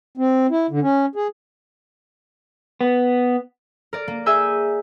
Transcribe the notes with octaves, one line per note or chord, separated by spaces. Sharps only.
C4
E4
D3
C#4
G#4
B3
A#4 D5
A#3
G#4 E5 G#5 E6 G6